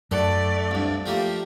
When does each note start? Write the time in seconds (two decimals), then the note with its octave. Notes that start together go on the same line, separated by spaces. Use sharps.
0.11 F#2 A3 D4 A4 D5 F#5
0.71 C2 G2
1.06 F3 A3 A#3 G4